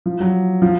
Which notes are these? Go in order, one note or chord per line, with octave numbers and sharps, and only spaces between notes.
F3
F#3
F3